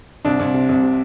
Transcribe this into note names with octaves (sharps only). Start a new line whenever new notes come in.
C2 D4
C2
C3
C2
C3